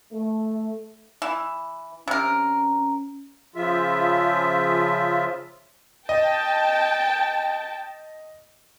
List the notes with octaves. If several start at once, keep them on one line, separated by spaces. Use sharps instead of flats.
A3
E3
C3 C#4 A#4
C#3 F3 F4 E5
D#5 G5 A5